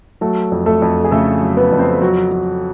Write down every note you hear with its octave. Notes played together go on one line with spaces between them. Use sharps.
F#3 A3 A4
F2
A3 A4
F2
G#4
C#3 A3 A4
F#3
B3 B4
F2
C4 C5
F#3 F#4
F#3